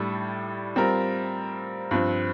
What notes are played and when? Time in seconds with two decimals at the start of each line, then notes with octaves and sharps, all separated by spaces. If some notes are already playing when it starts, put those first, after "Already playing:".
Already playing: A2 G3 D4 A4
0.76 G3 C4 F4 A#4
1.91 G2 F3 C4